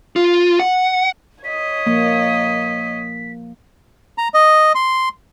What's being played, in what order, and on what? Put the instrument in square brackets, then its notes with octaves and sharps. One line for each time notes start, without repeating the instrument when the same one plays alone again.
[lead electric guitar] F4
F#5
[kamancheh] C#5 D#5 [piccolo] B6
[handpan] F3 A#3
[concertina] A#5
D#5
C6